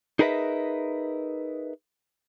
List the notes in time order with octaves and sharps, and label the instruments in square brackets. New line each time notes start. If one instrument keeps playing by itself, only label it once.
[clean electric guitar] D#4 G#4 A#4 B4 D#5 E5